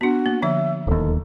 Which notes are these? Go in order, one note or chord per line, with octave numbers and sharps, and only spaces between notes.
B3 D4 F#4
A#3
D3 F3 C#5 E5
D1 D#2 A4